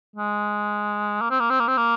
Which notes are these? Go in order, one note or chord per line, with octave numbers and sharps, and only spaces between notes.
G#3
A#3
C4
A#3
C4
A#3
C4
A#3